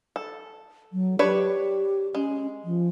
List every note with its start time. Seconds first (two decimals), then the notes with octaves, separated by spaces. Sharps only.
0.16 A4
0.93 F#3
1.19 D4 G4 B4 C#5
2.15 G#3 C#4
2.64 F3